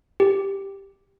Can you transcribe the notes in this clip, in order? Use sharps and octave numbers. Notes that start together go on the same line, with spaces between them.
G4